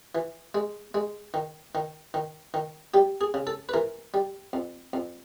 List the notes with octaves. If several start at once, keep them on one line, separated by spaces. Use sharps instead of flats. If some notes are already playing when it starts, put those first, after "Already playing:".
E3
G#3
G#3
D#3
D#3
D#3
D#3
G3 G4
G#4
C#3
A4
B4
E3 A#4
G3
F2
F2